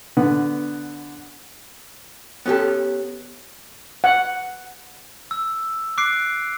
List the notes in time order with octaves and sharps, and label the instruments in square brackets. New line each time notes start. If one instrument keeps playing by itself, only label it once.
[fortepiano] D3 B3
[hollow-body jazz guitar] B3 C#4 F#4 G4 A4
[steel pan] F#5
[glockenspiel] E6
D6 F#6 C7 D7